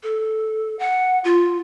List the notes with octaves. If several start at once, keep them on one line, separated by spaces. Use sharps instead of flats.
A4
F#5
F4